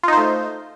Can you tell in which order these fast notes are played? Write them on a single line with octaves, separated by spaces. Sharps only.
F4 D#4 C5 A3